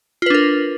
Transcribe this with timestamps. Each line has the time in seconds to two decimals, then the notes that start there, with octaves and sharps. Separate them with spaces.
0.22 F4
0.26 B4
0.30 D4
0.34 A#4